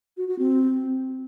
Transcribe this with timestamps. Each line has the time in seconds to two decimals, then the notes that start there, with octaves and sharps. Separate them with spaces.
0.17 F#4
0.28 F#4
0.39 C4